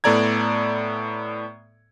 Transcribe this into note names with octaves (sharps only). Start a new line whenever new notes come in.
A2 B3 A4 D5 A#5 G#6